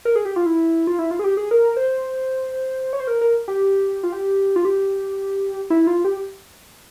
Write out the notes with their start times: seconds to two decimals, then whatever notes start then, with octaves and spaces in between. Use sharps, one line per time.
0.05 A#4
0.16 G#4
0.25 G4
0.36 F4
0.46 E4
0.87 F4
0.99 E4
1.11 F4
1.19 G#4
1.24 G4
1.37 G#4
1.51 A#4
1.77 C5
2.93 C#5
3.00 C5
3.07 A#4
3.21 A#4
3.48 G4
4.03 F4
4.12 G4
4.56 F4
4.65 G4
5.70 E4
5.87 F4
6.05 G4